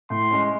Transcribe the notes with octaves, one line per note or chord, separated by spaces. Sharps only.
A2 C6
G#3 C#4